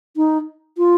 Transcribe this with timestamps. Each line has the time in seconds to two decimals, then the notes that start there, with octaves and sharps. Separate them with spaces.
0.16 D#4
0.78 F4